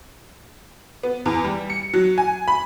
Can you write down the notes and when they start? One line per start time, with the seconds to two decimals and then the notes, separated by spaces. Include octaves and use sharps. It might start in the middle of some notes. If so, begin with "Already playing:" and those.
1.03 B3
1.26 E2
1.44 G3
1.70 C#7
1.94 F#3
2.18 G#5
2.48 B5